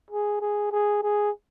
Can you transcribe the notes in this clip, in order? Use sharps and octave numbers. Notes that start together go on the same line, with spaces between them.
G#4
G#4
G#4
G#4